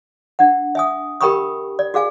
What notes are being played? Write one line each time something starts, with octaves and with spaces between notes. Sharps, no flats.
D4 F#5
E5 G#5 D#6
G4 A#4 G5 B5 C#6 D#6
D5
F#4 G#4 F5 G#5